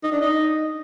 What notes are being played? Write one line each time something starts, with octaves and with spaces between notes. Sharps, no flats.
D#4
D4
D#4